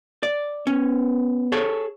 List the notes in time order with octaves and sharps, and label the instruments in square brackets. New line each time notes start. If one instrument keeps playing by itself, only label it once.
[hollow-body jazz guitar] D5
[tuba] B3 [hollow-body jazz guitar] C#4
[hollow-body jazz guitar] G#4 A4 C#5